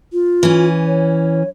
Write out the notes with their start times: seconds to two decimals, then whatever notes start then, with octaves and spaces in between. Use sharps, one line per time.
0.13 F4
0.43 E3 C#4
0.86 C#5